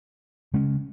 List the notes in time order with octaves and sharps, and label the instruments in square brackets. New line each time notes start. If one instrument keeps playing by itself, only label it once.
[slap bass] C#3 G#3 C#4